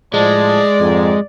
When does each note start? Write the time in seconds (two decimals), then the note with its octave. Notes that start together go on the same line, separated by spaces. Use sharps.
0.14 A2 F3 G#3 D5 A5
0.80 F2 G#2